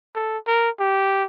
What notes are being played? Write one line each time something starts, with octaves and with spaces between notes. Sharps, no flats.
A4
A#4
G4